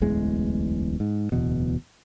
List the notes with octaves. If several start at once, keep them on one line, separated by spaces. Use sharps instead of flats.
D1 A1 E2 G#3
G#2
D1 E2 B2